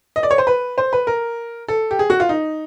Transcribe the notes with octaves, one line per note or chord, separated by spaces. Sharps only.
D#5
D5
C#5
C5
B4
C5
B4
A#4
A4
G4
G#4
F#4
F4
D#4